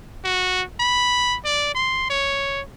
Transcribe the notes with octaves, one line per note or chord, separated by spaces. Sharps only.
F#4
B5
D5
C6
C#5